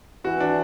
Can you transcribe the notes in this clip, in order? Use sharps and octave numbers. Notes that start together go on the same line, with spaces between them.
E3 F#4
D4